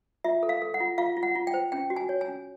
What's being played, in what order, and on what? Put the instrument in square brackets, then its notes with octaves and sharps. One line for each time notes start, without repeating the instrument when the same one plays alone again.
[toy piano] F4 E5
A4
F5
A4
F#5
F4
F4 F5
F4
F#5
F4
G5
C5
C#4 G5
F#4
G#5
C#5
G#5
C#4